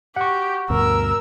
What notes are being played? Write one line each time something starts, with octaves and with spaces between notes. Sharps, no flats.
G4 F#5 C#6
D2 G2 B2 A#4 E6